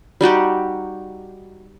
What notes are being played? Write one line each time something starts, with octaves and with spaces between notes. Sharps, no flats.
G3 D#4 F#4 G4